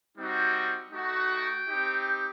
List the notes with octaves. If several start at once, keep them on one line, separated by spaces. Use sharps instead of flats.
G3 C4 D#4 F#4
A3 D#4 F#4
G5
C4 D#4 G4